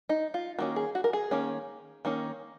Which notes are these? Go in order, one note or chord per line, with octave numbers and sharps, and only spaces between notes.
D#4
F4
D#3 A#3 C#4 F#4
G#4
F#4
A#4
G#4
D#3 A#3 C#4
D#3 A#3 C#4